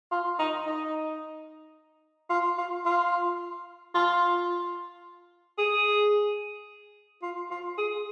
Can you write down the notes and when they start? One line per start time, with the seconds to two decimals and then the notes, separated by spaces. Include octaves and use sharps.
0.12 F4
0.39 D#4
0.67 D#4
2.30 F4
2.58 F4
2.85 F4
3.95 F4
5.58 G#4
7.23 F4
7.51 F4
7.78 G#4